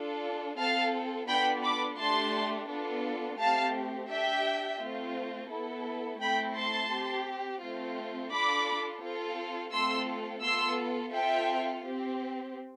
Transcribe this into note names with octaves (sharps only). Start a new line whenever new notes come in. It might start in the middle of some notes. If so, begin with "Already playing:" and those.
Already playing: D4 F4 A4
C4 F4 A4 F5 A5
B3 D4 F4 A4 G5 B5
B5 D6
A3 D4 G4 A5 C6
B3 D4 F4 A4
A3 C4 G4 F5 A5
D4 G4 E5 G5
A3 C4 F4
B3 E4 A4
A3 C4 E4 G5 B5
A5 C6
C4 G4
A3 C4 F4
D4 F4 A4 B5 D6
C4 F4 A4
A3 C4 F4 A4 C6 E6
B3 F4 A4 C6 E6
C4 F4 A4 E5 G5
C4 G4